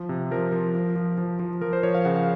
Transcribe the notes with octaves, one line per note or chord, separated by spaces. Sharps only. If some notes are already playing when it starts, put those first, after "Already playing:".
Already playing: F3
C3
F3 A#4
F3
F3
F3
F3
F3
F3 A#4
C5
F3 C#5
F5
C#3 F#5
F5